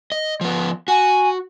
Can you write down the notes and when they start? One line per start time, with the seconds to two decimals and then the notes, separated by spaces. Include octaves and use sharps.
0.12 D#5
0.41 F3 B3
0.88 F#4 G#5